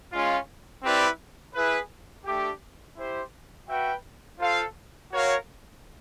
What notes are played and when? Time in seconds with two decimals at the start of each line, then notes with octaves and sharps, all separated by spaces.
0.12 G#3 C#4 F4
0.83 C4 E4 G4 B4 D5
1.55 E4 G#4 B4
2.26 A3 D4 G4
2.97 E4 G4 C5
3.69 F#4 B4 E5 G5
4.40 F4 A4 C5 F5
5.10 F#4 A#4 C#5 F5